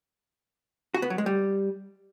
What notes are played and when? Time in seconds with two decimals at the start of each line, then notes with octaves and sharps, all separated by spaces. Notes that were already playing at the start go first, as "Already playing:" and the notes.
0.94 F#4
1.02 B3
1.10 F#3
1.18 G#3
1.26 G3